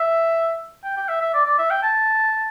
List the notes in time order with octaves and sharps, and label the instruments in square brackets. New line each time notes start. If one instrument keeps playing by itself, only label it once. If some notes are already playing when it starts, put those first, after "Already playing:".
Already playing: [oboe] E5
G5
G5
E5
E5
D5
D5
E5
G5
A5